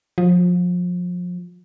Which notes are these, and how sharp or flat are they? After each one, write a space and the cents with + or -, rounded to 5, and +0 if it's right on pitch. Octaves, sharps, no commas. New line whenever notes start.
F3 +30